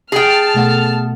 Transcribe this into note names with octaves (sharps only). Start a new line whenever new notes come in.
G#4 G5 A5 F6
B2 A3 F#5